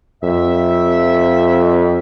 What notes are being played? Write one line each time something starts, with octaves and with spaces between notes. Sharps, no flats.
F2 E5